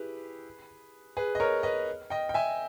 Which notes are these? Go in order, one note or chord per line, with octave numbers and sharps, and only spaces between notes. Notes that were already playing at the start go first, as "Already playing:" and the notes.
Already playing: E4 G4 G#4 B4
G#4 B4
D#5
A#4 C#5
B4 D#5
D#5 G5
G5
E5 G#5